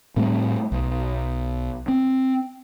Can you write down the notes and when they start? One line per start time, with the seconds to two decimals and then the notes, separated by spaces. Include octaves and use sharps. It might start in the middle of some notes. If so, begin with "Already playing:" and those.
0.16 A2 G3 A3 C4
0.72 B1
1.88 C4